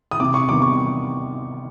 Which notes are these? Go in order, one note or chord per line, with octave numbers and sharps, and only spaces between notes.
D#6
C3 D6
C#6
D#3 G3 B3 D6
C#6